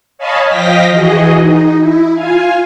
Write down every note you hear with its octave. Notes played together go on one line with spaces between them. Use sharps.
C#5 D#5 F5 G#5 A5 B5
F3 D#5 F5 G5 A#6 B6
E3 F#4 G#4 D#5
D#4
E4
F4 F5 G#5